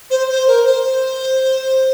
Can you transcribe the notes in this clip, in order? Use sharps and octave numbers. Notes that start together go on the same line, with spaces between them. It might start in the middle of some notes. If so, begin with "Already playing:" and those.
C5
C5
A#4
C5